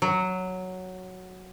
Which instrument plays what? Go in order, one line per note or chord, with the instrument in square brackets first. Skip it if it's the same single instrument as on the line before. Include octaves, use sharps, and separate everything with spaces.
[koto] F#3